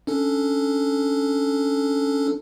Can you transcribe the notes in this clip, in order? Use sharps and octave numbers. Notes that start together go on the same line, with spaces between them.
C#4 D4 A4